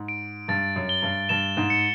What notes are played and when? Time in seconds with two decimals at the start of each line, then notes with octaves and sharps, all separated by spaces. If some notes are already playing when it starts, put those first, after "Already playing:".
Already playing: G#2
0.08 D7
0.48 G2 A6
0.76 F#2
0.89 G7
1.02 G2
1.29 G2 E7
1.57 G#2
1.70 C#7